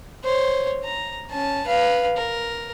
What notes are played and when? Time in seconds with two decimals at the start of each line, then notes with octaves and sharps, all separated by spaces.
0.24 C5 C#5
0.84 A#5
1.30 C#4 A5
1.65 B4 F5
2.17 A#4